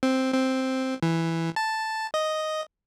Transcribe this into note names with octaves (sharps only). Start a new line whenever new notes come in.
C4
C4
E3
A5
D#5